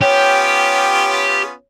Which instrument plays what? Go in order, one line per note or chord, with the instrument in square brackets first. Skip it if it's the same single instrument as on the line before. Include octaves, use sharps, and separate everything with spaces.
[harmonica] B3 C#4 F4 [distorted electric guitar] G4 [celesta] C#5 [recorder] G5